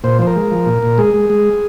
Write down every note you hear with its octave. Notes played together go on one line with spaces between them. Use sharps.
A#2 C5
F3 C5
A#4
G#3
F3
A#2
A#2
G#3 G#4
G#3
G#3